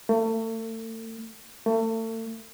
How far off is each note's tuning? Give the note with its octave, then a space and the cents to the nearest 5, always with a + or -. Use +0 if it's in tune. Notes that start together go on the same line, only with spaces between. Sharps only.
A3 +35
A3 +35